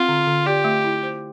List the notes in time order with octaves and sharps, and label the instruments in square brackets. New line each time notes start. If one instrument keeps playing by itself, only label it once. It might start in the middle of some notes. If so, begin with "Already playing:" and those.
Already playing: [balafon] C4 [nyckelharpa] F4
[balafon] D3
D3
[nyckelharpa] G4 [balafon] D5
[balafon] A3
E4
C5